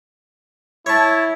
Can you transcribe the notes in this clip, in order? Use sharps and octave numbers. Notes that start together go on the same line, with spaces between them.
E4 C#5 A5